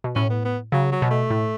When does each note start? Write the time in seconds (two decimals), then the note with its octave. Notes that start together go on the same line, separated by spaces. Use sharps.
0.04 B2
0.15 A2 C#4
0.30 B3
0.45 B3
0.72 C#3 F#3
0.92 F#3
1.02 B2
1.11 A3
1.30 A2